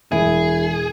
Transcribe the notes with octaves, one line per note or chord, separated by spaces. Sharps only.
E1 E4 G#4